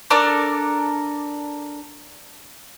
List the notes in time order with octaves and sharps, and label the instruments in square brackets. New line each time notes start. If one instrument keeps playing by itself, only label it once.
[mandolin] D4 A4 A#4 D5